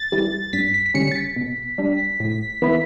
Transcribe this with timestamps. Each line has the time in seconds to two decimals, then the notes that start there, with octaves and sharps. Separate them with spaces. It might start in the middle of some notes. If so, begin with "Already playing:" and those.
Already playing: A6
0.12 E3 G3
0.53 G2 B6
0.74 B6
0.86 B6
0.94 D3 G3 C#4 C#7
1.11 A6
1.15 B6
1.36 B2
1.78 G3 D4
2.20 A2
2.62 E3 B3 E4